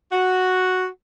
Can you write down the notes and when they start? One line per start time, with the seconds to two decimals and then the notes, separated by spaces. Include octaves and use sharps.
0.12 F#4